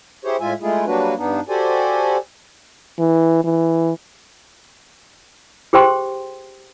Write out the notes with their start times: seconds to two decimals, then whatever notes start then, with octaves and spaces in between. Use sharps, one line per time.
0.24 E4 G4 G#4 C5 C#5
0.40 A2 G#3 F4 E5 G#5
0.62 G#3 A3 E4 F4 G#4
0.86 F#3 G3 A#3 D4 F#4 B4
1.18 G2 B3 D4 D#4
1.49 F#4 G4 A4 C5 D5 G#5
2.99 E3
3.44 E3
5.73 G4 G#4 C5 G5 C6